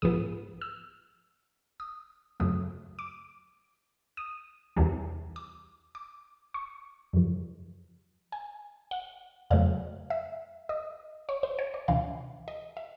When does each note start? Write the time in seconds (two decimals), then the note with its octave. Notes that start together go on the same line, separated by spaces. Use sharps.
0.02 A#1 G#2 F3 G#3 B3 D#6
0.61 E6
1.80 D#6
2.40 F#2 C#3 F#3 A3 D#6
2.99 D6
4.17 D#6
4.76 E2 C3 E3 G3
5.36 D6
5.95 D6
6.54 C#6
7.13 F#2 C#3 F3
8.32 G#5
8.91 F#5
9.50 F2 C#3 F#3 A3 F5
10.10 E5
10.69 D#5
11.29 C#5
11.43 C5
11.59 C#5
11.74 D5
11.88 D2 C3 E3 F5
12.48 D#5
12.77 E5